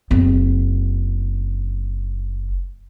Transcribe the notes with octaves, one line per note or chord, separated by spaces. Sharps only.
F#1 C4